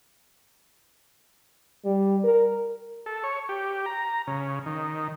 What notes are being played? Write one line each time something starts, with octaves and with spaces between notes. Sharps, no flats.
G3
A#4
A4
C#5
G4
A#5
C#3
D#3